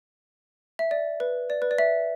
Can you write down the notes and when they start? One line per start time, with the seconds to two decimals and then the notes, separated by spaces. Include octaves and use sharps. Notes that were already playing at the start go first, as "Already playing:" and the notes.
0.79 E5
0.91 D5
1.20 B4
1.50 D5
1.62 B4
1.71 D5
1.78 E5